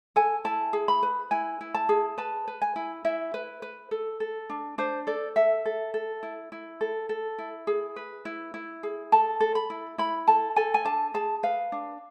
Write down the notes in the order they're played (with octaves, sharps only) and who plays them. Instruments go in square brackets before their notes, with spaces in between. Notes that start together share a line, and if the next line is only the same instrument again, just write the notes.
[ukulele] A4 G#5
E4 A5
G#4
B5
B4
E4 G#5
E4
A5
G#4
B4 A5
B4
G#5
E4
E4 E5
B4
B4
A4
A4
D4
D4 C5
A4 D5
A4 E5
A4
A4
E4
E4
A4
A4
E4
G#4
B4
E4
E4
G#4
A4 A5
A4
B5
E4
E4 B5
A4 A5
A4 G#5
G#5
D4 A5
G#4 A5
B4 F5
D4